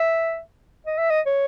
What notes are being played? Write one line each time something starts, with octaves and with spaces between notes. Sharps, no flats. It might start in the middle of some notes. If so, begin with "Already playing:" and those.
Already playing: E5
D#5
E5
D#5
C#5